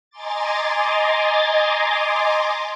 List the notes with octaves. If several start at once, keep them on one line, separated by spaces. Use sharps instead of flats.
D#5 G#5 A#5 C6 D6 A6